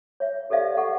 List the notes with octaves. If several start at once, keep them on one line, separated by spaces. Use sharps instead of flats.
C#5 E5
G4 A4 C5 D5 E5 F5
A4 F#5 C#6